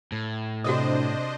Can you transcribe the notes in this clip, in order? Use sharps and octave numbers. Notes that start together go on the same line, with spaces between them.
A2
C3 D4 F#4 A4 C5 D#5 D#6